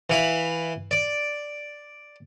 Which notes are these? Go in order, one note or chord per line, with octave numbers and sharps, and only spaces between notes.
E3 F5 B5
D5